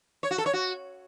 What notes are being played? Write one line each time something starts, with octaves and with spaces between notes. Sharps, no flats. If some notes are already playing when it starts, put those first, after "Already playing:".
C#5
F#4
A4
C#5
F#4